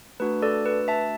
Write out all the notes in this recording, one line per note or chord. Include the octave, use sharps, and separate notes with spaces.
A3 D4 F#4 B4
A4 D5
B4
E5 A5